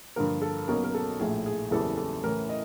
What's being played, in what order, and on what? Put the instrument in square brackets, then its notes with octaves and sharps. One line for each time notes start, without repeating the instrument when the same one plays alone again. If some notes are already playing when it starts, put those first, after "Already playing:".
[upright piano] G2 D3 F3 A#3 A#4
A4
B1 B2 F#3 A#3 C#4 A#4
A#4
A4
A#1 A2 F3 A3 G#4
G#4
F#1 E2 C#3 E3 G3 A4
A4
A1 A2 E3 A3 C#4 A#4
D#5